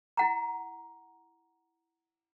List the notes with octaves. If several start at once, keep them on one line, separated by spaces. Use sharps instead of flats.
E4 F#5 A#5